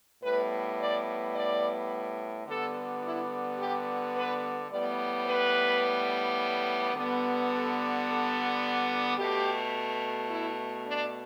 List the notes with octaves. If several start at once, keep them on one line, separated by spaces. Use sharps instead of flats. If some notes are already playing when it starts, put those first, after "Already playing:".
A2 G3 B3 B4
D5
D5
D3 G3 B3 A4
E4
G4
B4
A2 G3 B3 D5
B4
D3 G3 B3
A4
A4
B2 A3 G4
E4
D4